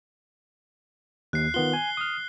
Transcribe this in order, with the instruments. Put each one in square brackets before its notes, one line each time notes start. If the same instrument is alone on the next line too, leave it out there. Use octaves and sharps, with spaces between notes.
[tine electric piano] D#2 [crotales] F#6 C7
[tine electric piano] D#3 B3 F4 [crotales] G7
[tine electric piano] G#5
D#6 F6